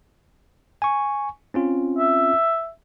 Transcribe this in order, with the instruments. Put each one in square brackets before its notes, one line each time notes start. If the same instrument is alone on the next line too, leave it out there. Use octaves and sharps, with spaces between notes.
[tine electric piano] G#5 C#6
C4 C#4 F4
[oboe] E5